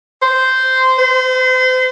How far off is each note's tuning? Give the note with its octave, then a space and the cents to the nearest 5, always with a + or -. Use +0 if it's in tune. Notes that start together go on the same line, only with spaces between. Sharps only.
C5 -10
C5 -35